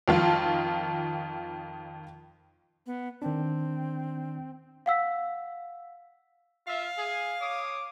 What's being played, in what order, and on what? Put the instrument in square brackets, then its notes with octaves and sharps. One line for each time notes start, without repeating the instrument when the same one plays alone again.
[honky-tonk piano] F2 D#3 F4 A5
[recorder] B3
[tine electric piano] D#3 D4 [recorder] C4
[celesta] F5 F#5 E6 B6
[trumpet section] F4 E5 [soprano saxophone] F5
[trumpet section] G#4
C#5 D6 D#6